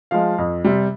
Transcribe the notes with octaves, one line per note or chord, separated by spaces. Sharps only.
F3 G#3 F5
F2
C3 G3